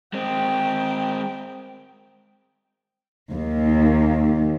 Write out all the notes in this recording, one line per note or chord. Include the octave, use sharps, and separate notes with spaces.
G#3 C4 G5
D#2